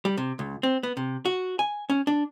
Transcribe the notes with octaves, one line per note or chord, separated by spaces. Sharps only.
G3
C3
C#2
C4
B3
C3
F#4
G#5
C#4
D4